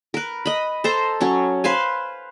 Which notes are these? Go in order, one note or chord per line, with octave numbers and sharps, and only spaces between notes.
A#4 B4
D#5 B5
A4 C5 A#5
F#3 C#4 C#6
B4 C5 F5 G#5